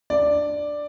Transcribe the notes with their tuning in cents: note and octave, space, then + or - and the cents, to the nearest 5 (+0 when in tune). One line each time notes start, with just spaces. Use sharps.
D4 +0 D5 +5